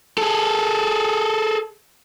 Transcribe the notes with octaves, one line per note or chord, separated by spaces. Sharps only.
G#4 A4